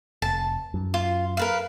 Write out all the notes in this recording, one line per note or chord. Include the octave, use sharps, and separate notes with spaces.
F1 A5
F#2
F4
A#4 B4 F5